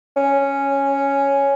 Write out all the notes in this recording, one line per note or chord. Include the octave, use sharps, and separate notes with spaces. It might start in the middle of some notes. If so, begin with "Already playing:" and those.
C#4